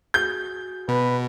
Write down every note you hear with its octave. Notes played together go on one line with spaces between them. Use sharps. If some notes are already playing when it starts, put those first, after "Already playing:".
F#4 G#4 G6
B2 B4